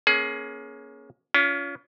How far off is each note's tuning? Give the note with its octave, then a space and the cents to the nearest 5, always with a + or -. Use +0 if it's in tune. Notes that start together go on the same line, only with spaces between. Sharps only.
A#3 +30 C#4 +0 G#4 +25
C#4 +35 F4 +0